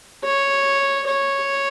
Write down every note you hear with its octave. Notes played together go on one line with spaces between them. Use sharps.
C#5
C#5